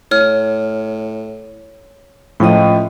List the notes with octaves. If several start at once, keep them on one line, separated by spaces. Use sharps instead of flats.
A2 C#5 F6
C#2 A2 F3 D#5 G5